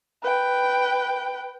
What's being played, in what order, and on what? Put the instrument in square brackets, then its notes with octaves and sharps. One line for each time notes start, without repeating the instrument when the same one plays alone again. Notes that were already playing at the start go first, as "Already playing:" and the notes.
[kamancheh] B4 G5